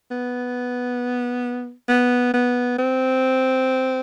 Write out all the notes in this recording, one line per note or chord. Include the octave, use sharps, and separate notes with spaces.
B3
B3
B3
C4